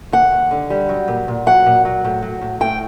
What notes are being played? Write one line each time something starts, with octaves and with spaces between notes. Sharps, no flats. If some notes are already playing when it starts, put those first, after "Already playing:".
D#2 F#5
D#2
D3
G3
F#3
A#2
A#2
F#3 F#5
A#2
F#3
A2
F#3
A2
A2 G5